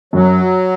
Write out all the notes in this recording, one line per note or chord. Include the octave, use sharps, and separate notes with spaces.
F#2 F#3